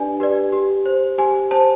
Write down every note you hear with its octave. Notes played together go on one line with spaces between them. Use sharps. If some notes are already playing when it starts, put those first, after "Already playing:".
Already playing: D4 G4 B4 D5 G#5
G4 B4 D5
G4
C5
G4 G#5
C5 A5